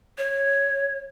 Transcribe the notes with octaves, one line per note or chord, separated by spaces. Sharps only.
C#5